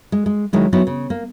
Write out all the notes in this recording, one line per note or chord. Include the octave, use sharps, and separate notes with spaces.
G#3
G#3
D#3 F#3 G#3 E4
F#3 B3 D#4 E4
C#3
A#3